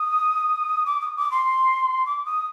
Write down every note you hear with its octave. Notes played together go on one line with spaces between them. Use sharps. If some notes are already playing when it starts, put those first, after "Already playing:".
Already playing: D#6
D6
D#6
D6
C6
D6
D#6